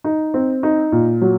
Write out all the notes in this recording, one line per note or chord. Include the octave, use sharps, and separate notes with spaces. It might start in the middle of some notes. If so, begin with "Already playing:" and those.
D#4
C4
D#4
A#2
F#3